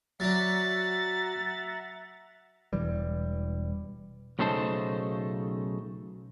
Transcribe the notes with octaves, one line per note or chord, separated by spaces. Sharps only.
F#3 D4 E5 F#5 A#5 A6
E1 E3 G3
B1 C#3 A3 D#4 C5 A5